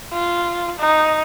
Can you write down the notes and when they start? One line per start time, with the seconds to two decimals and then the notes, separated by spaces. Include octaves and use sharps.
0.13 F4
0.79 D#4